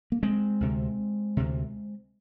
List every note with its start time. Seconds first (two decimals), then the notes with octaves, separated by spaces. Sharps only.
0.12 A#3
0.23 G#3 C4
0.61 D2 C3
1.37 D2 C3